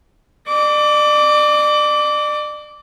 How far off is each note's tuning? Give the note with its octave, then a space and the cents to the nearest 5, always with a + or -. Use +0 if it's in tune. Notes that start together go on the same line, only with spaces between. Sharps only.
D5 +35 D6 -20